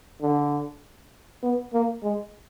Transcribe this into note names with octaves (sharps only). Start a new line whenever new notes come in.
D3
B3
A#3
G#3